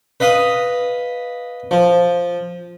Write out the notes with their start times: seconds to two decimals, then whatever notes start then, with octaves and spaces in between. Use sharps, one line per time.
0.20 B4 D#5 F5 D#6
1.71 F3